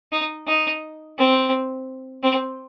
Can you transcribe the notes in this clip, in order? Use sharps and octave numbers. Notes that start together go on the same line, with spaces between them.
D#4
D#4
C4
C4